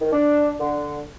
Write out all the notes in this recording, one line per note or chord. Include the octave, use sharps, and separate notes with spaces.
D#3
D4
D3